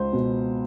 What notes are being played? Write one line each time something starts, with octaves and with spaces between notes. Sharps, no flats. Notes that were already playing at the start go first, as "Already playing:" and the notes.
Already playing: C#2 C5
B2